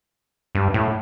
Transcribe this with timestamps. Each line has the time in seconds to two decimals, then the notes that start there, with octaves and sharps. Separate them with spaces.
0.55 G2
0.74 A2